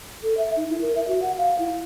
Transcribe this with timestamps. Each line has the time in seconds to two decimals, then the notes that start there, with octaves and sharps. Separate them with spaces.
0.23 A4
0.38 E5
0.56 D#4
0.69 E4
0.81 A#4
0.96 E5
1.08 F#4
1.22 F#5
1.38 F5
1.59 E4